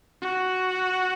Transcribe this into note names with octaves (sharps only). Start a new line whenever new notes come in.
F#4